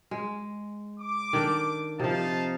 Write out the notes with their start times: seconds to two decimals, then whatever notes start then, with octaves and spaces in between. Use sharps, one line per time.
0.11 G#3
1.00 D6
1.33 D#3 D4 A4
2.00 C3 F3 D#4 F5 A5